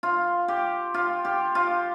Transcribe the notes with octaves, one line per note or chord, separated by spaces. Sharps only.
F4
G4
F4
G4
F4